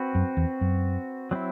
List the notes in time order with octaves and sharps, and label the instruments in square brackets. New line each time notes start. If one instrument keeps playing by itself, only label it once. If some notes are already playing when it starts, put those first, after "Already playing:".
Already playing: [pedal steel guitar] C4 F#4 B4
[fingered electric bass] F#2
E2
F#2
[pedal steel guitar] F#3 C4 E4